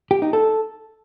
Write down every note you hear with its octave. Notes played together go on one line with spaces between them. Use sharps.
G4
D#4
A4